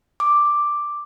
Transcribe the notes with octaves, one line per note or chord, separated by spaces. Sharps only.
D6